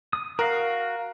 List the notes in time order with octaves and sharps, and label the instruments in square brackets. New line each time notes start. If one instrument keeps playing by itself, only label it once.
[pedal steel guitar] D#6
[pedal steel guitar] F#4 F5 [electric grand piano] A#4